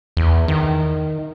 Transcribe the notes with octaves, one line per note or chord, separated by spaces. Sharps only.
E2
D#3